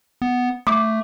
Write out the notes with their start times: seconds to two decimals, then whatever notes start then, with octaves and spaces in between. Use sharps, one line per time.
0.22 B3
0.67 A3 D6